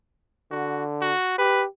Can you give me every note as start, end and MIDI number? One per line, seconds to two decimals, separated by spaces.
0.51 1.12 50
0.51 0.84 66
1.01 1.35 66
1.38 1.66 67
1.38 1.63 71